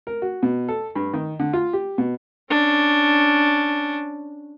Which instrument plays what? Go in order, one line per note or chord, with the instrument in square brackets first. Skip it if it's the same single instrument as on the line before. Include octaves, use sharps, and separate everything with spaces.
[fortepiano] A#4
F#4
B2
A4
G2
D#3
D3
F4
G4
B2
[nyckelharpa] C#4 D4